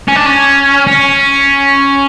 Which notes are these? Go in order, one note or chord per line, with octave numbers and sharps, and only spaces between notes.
C#4
D4
C#4
C#4